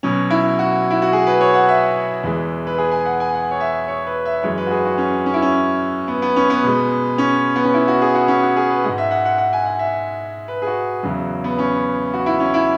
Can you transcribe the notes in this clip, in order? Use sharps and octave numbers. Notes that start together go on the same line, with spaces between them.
B2 F#3 C#4
E4
F#4
E4
F#4
G#4
B4
C#5
F#5
E5
E2 E3 G#3
B4
G#4
G#5
F#5
G#5
F#5
C#5
E5
C#5
B4
E5
F#2 E3 G#3 C#5
B4
F#4
G#4
F#4
C#4
C#4
E4
C#4
B3
B3
C#4
B3
B2 G#3
C#4
B3
C#4
E4
F#4
G#4
F#4
C#4
F#4
G#4
B4
G#2 G#3 F#5
E5
F#5
F#5
F#5
G#5
F#5
E5
B4
G#4
F#4
E2 C#3 F#3
B3
C#4
F#4
E4
C#4
E4